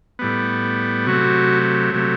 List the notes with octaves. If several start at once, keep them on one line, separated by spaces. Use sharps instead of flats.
A2 G3 B3
C3 F#3 A3 F#4
C3 F#3 A3